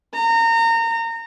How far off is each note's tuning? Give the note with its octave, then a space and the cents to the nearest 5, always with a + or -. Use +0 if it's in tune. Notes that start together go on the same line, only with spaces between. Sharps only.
A#5 -30